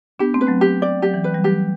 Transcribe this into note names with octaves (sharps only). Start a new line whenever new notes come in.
B3 D4 G4
A3 C4
B4
F#3 A3
G4
D5
F#3 G4
E3
B4
E3 G3
F#3 A3 G4